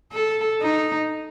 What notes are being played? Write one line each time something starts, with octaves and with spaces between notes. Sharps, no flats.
A4
D#4